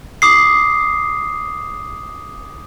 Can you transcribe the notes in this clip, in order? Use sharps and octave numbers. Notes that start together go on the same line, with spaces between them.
D6 D#6 C7